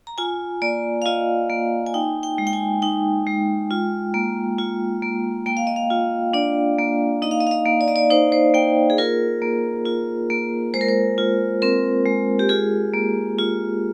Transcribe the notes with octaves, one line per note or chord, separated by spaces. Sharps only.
A#5
F4 G#5
A#3 D5
F5
F4 D#5
A#3
G#5
D#4 G5
G5
G#3
G5
G#5
D#4 G5
G#3
F4
A#3
F4
A#3
A#3 G5
F5
D#5
F5
F4
D4 D5
A#3
D#4 D#5
F5
D#5
F5
D#5
A#3
D5
D#5
D5
D#4 C5
C5
A#3 G5
G#4
F4 A#4
A#3
F4
A#3
G#3 C5
A#4
C5
F4
C4 A#4
G#3
G4
F4 G#4
A#3
F4